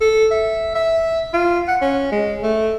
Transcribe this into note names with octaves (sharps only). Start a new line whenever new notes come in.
A4
E5
E5
F4
F#5
C#4
G#3
A3